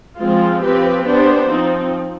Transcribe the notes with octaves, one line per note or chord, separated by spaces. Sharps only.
F3 G#3 C4 F4
F3 C4 G4 B4
B3 D4 G4 C5
F3 C4 D#4